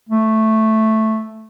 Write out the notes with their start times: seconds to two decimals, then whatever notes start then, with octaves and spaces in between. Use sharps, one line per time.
0.09 A3